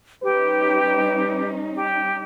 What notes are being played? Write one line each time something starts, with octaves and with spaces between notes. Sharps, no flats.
G3 C#4 D#4 G4 B4
G4